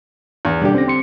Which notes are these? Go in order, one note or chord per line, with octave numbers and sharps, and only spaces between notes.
E2
D#2 B2 D3 G3 G4
C4 C#4 A#6
C4 C6 C#7